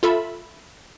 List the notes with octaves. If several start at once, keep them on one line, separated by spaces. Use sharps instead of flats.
F4 A4 E5 B5